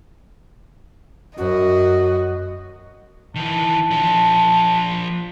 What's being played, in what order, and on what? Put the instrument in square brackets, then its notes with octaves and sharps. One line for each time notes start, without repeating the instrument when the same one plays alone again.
[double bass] F#2 [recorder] F#4 [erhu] D#5
[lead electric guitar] D#3 E3 [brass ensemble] A5
[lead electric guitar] F3 D4